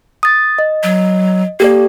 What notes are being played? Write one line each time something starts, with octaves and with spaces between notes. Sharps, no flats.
D#6 A6
D#5
F#3
A#3 G4 A4 D5